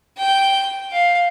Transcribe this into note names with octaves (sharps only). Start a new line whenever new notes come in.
G5
F5